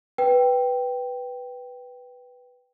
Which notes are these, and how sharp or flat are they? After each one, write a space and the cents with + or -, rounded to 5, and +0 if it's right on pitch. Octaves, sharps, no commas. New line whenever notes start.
B4 +0 G5 +0